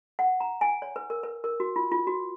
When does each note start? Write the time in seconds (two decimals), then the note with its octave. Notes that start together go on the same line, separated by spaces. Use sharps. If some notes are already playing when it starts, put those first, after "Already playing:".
0.19 F#5
0.40 A#5
0.61 G#5
0.82 C#5
0.96 B4
1.10 A#4
1.23 B4
1.44 A#4
1.60 F#4
1.76 F4
1.92 F4
2.07 F#4